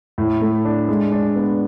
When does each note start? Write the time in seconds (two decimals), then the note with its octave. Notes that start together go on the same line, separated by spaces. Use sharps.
0.18 A2
0.41 A3
0.65 D4
0.89 G#3
1.12 D4
1.36 B3